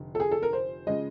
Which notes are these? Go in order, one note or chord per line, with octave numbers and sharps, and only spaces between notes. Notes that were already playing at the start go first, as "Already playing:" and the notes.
Already playing: F1 D3
A4
G#4
A4
A#4
C5
C#3 F3 G#3 D#5